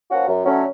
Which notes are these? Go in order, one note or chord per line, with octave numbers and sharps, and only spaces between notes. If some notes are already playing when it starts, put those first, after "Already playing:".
F3 A#3 C#4 F#4
F#2
D3 F#3 A3 C#4